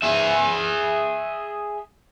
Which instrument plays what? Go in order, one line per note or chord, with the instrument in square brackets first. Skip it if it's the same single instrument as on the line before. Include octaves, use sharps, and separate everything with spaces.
[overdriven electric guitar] G#4 E5